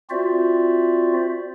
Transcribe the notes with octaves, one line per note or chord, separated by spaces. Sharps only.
C4 F4 F#4 C5 D5 E5